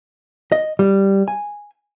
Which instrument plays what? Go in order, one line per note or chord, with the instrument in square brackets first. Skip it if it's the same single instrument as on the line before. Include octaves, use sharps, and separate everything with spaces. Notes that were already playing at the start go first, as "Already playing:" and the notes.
[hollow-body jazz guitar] D#5
G3
G#5